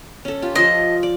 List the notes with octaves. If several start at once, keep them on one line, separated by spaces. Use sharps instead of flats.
C#4 A4
F4 G4
F3 F4 D#5 C6
D5